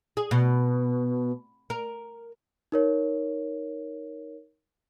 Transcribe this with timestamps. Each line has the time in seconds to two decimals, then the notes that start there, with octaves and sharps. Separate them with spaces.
0.17 G#4
0.31 B2
1.70 A#4
2.72 D#4 A#4 C#5